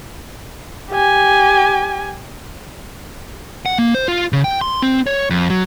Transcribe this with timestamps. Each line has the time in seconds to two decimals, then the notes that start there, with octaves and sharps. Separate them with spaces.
0.91 G4 G#5
3.66 F#5
3.79 A#3
3.95 C5
4.08 F4
4.33 C#3
4.44 G5
4.61 C6
4.82 C4
5.07 C#5
5.30 F2
5.50 F#3